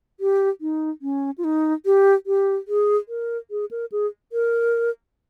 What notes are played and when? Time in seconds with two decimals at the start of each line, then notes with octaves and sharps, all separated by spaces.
0.20 G4
0.61 D#4
1.02 C#4
1.38 F4
1.44 D#4
1.86 G4
2.27 G4
2.68 G#4
3.09 A#4
3.51 G#4
3.71 A#4
3.92 G#4
4.32 A#4